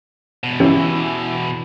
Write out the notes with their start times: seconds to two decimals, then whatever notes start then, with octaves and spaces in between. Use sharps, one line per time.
0.44 E2 B2
0.60 E3 C#4 G4